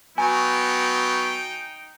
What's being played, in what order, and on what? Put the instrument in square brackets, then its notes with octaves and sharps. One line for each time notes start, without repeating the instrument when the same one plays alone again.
[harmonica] F#3 B3 [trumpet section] D#4 G5 [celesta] G#5